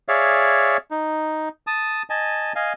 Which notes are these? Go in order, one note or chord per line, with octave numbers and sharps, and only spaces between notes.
G#4 C#5 D5 E5 F5
D#4
A5 D#6
D#5 G#5 A5
D#5 F5 G#5